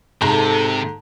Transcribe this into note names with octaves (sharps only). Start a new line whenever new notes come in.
G#2 C3 A4 A#5